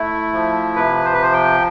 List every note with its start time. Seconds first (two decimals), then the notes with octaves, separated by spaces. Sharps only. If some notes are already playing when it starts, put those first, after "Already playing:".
Already playing: A3 E4
0.33 F3
0.76 C3 B4
1.05 C5
1.14 B4
1.18 F3 C5
1.34 G5